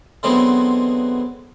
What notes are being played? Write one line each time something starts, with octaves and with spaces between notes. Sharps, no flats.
D3 E3 F#3 G#3 B3 C4